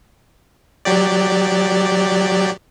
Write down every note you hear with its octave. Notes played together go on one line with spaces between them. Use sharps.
F#3 G4 D5